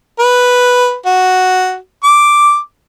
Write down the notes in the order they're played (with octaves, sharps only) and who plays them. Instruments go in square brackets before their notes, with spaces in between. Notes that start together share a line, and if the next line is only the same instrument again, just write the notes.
[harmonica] B4
F#4
D6